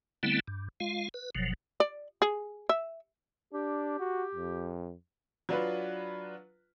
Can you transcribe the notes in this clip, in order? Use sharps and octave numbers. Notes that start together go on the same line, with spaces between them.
D3 G3 A3 B3 C4 E4
G2
G#3 F4 F5
B4
F#1 B2 F3 F#3
D5
G#4
E5
D4 G4
F#4
F2
F#3 D4 F4 B4